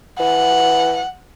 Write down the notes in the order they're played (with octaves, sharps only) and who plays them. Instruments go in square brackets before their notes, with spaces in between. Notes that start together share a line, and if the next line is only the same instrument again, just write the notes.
[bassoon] E3 [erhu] F#5